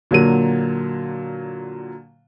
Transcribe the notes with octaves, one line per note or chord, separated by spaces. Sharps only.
A#2 D3 F#3 A#3 D#7